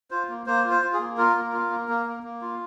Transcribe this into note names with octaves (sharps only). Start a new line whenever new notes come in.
F4 C5
A#3
A#3 C5
F4
C5
F4
G#4
A#3
F4 A#4
A#3
F4
A#3
A#3
A#3
A#3
F4